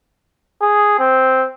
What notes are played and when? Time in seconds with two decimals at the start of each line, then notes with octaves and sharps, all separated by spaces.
0.62 G#4
0.99 C4